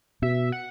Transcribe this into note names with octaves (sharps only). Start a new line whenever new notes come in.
B2 E5
F#5